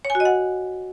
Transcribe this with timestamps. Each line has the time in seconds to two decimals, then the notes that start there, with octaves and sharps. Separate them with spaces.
0.05 C#5
0.10 G#5
0.15 F#4
0.20 D#5
0.25 F#5